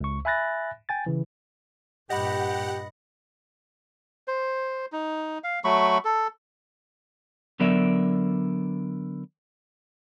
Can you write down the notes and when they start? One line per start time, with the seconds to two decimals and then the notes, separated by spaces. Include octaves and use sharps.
0.01 C#2 C#6
0.25 E5 G#5 B5 F#6 A6 A#6
0.89 G5 G#5 A6
1.06 C#3 E3
2.10 G2 A#2 G4 D#5 F#5 B5
4.28 C5
4.92 D#4
5.44 F5
5.64 F#3 A3 B5 C#6
6.05 A4
7.60 D3 F#3 B3 A#4 D5 E5